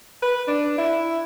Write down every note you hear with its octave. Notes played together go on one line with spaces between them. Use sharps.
B4
D4
E4